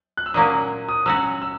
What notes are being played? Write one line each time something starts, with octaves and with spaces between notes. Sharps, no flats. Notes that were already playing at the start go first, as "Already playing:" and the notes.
F#6
E6
A#2 F#3 A#3 C#4 D#6
D#6
F#3 C#4 F#4 E6
E6